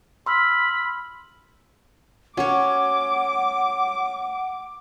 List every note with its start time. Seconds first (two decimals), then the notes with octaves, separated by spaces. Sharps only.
0.26 B5 C6 E6 F6
2.37 C#4 F#4 C#5 F#5 D6